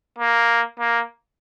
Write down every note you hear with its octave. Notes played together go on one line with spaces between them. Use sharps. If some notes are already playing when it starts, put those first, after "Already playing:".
A#3
A#3